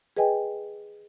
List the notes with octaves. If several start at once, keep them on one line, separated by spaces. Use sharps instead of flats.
G#4 B4 D#5 G5 G#5